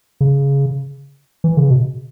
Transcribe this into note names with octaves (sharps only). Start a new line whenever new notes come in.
C#3
E3
C#3
B2